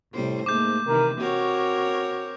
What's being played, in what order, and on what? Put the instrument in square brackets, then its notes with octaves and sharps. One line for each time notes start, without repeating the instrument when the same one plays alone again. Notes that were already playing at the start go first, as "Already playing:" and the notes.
[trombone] A2 [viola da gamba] C3 G3 C5
[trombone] G#2 [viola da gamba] A3 A#3 [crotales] D6 G6
[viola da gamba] C3 D#3 E3 [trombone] A#4
[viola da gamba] C4 A#4 C#5 [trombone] F#4